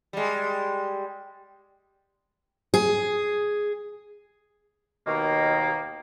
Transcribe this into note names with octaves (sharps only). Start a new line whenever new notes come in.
G3 G#3
G#4
D#2 B2 D#3 A#3